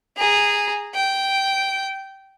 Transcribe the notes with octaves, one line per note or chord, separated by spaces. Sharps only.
G#4 A#5
G5